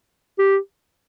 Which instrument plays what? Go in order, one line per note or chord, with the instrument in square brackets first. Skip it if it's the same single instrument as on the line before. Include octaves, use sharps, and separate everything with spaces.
[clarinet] G4